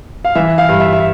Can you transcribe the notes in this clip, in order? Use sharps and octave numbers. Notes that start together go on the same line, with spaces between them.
F5
E3 E5
F5
G2
E5
E5